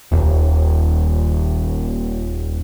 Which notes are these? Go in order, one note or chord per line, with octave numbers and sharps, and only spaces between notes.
D#1 D#2